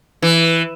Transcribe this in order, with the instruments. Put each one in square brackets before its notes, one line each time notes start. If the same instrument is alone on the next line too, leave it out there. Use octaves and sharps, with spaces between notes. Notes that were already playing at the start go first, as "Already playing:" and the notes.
[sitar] E3